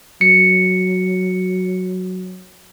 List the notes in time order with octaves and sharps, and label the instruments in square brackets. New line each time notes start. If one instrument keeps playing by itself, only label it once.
[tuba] F#3 [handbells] C#7